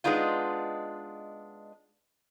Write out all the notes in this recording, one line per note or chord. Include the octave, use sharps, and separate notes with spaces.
G#3 B3 D4 D#4 F4